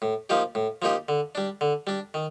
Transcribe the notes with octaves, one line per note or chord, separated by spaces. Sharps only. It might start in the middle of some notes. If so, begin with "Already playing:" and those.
A2
F3 A#3 D#4 G4
A2
F3 A#3 D#4 G4
D3
G3 D4
D3
G3 D4
D#3